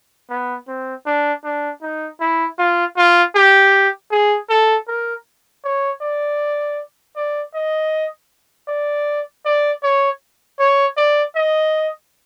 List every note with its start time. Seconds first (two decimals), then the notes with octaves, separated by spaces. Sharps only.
0.30 B3
0.68 C4
1.06 D4
1.44 D4
1.82 D#4
2.21 E4
2.59 F4
2.97 F4
3.36 G4
4.11 G#4
4.50 A4
4.88 A#4
5.64 C#5
6.02 D5
7.16 D5
7.55 D#5
8.68 D5
9.46 D5
9.83 C#5
10.60 C#5
10.97 D5
11.36 D#5